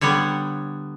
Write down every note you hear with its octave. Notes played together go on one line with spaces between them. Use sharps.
D3 G3 B3 C#5